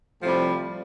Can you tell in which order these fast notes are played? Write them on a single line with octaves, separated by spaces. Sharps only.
A2 F3 C3 G3